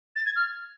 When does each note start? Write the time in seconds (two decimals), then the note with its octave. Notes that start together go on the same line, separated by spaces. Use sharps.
0.16 A6
0.25 G#6
0.35 F6